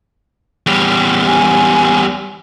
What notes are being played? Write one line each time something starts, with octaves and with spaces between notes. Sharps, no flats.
E2 G3
G#5